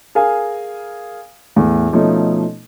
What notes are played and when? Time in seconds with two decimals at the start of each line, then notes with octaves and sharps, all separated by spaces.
0.15 G#4 A#4 F5 G#5
1.56 E2 A2
1.93 B2 F3 A3 C#4 D#4 A4